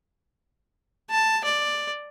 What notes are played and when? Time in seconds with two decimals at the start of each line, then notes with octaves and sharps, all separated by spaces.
1.10 A5
1.44 D5